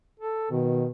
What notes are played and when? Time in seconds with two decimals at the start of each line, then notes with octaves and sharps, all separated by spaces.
0.20 A4
0.51 B2 D#3